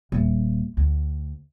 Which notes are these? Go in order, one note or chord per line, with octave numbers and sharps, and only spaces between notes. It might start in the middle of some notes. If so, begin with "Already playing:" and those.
D#1
D2